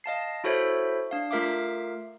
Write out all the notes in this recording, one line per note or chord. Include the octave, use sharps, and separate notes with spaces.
D#5 F5 A5 C7
E4 F#4 A4 C5 C#5 E5
D4 F5
A3 F4 A#4 E5 F5 D6